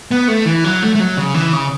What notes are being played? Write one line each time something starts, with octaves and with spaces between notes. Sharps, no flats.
B3
A3
E3
F#3
A3
A3
F#3
C#3
E3
C#3